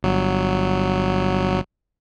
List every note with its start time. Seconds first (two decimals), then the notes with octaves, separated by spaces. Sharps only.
0.03 G1 F#3